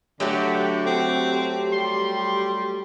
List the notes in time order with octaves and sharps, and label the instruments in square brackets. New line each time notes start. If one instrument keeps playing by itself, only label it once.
[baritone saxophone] D3 [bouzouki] F#3 A3 F#4 [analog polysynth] G4
[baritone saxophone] C4
[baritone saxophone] G3 [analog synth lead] C6